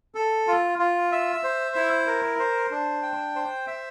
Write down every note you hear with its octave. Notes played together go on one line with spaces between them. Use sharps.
A4
F4
F4
E5
C5
E4
A#4
C5
D4
G5
C5
E5